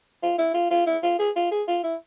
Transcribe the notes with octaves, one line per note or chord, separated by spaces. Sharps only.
F4
E4
F4
F4
E4
F4
G#4
F4
G#4
F4
E4